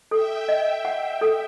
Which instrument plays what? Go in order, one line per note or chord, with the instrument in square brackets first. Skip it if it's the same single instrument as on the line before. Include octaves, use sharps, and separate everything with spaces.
[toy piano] A4 [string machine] E5 G5
[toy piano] D#5
F#5
A4